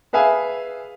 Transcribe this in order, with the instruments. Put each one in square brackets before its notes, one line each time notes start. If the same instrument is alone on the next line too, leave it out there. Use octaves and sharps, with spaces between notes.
[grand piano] G#4 B4 E5 F5 G#5